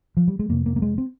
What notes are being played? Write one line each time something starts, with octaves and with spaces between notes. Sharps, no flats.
F3
G3
G#3
F2 C3 A#3
A#3
A#3
G#3
C4